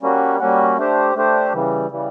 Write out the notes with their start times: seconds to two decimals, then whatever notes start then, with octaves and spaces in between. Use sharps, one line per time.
0.02 G3 A#3 C#4 F#4
0.39 G3 A#3 C#4 F#4
0.77 A3 D4 G4 C5
1.15 A3 D4 G4 C5
1.53 C#3 E3 G3
1.91 C#3 E3 G3